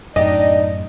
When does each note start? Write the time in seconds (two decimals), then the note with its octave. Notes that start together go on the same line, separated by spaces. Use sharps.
0.16 F#2 A2 D4 D#4 G4 D#5